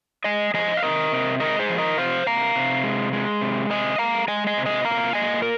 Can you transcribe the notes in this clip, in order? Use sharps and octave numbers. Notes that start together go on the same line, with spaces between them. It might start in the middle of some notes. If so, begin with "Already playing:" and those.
G#3 D#5 G#5
F3 D#5 G#5
F5
C3 A#4 D#5
C3
G#3 A#4 D#5
G#4 C5
F3
A#4 D#5
C3 C5 F5
C3 F5 A#5
C3
G#3
G#3
C3
C3 D#5 G#5
G#3 F5 A#5
G#3 D#5 G#5
D#5 G#5
C3
D#5 G#5
A#2 F5 A#5
A#3 D#5 G#5
A#4